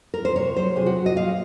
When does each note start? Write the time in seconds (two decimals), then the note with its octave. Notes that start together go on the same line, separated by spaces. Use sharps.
0.14 A#4
0.25 C5
0.36 C3 C#5
0.56 F#3 C5
0.76 C3 G#4
0.86 F#4
0.96 F#3
1.06 D#5
1.16 A#2 F5